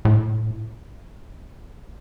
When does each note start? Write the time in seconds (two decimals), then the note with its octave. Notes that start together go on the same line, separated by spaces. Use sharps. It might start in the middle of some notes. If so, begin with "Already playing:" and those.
0.05 A2